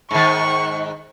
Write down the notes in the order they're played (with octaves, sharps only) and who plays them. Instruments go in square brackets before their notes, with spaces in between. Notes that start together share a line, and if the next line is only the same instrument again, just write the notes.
[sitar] G#2 D#3 [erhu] C#6